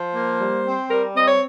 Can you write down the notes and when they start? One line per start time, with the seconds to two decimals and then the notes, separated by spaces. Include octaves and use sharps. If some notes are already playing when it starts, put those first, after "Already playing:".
Already playing: F3 C5
0.14 A#3
0.39 G3
0.64 C4
0.89 G3 A#4
1.14 C4 D#5
1.27 C#5